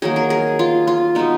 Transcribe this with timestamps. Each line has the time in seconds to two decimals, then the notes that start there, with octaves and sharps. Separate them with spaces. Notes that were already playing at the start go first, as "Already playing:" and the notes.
0.02 D#3 F#3 A#3 G#4
0.16 A#4
0.30 G#4
0.59 F4
0.87 F4
1.15 B2 G#3 B3 D#4